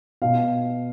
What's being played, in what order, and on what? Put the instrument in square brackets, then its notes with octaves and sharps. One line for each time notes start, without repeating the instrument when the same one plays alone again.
[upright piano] B2 F5